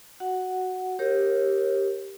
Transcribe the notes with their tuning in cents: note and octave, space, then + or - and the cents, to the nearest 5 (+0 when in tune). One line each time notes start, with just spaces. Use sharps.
F#4 +0 F#5 +0
G4 +0 A#4 +0 C#5 -35